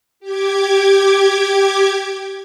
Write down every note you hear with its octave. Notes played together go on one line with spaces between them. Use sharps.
G4 D6 G#6